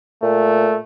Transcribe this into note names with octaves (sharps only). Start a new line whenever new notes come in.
A#2 A3